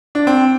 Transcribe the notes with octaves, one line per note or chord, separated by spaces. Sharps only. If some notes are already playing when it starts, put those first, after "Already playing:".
D4
C4